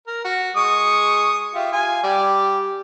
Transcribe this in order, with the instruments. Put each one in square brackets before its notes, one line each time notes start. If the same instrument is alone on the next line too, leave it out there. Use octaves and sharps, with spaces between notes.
[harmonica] A#4
F#4
G#3 C#6 D#6
F4 G4 E5
F4 G#5
G3 G4 D5